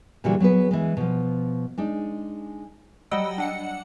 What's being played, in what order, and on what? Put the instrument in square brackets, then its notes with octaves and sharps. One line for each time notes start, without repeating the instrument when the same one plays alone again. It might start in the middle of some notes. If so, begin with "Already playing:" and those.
[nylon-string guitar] A#2 D3 E3 G3 F#4 G#4
F#3 B3 G#4 B4
E3 G#3
B2 F3
G#3 D4 D#4
[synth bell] F#3 G3 D#5 F#5 G5 E6
D4 F#5 C#7